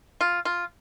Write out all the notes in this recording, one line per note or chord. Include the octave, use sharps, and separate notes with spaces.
F4
F4